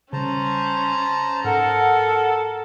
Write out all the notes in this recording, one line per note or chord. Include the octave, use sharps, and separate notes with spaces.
C#3 G3 C#4 C5 A5 A#5
G#2 A4 A#4 F#5